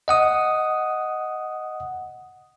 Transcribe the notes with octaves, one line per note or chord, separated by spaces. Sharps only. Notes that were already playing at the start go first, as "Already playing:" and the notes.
D#5 F#5 D#6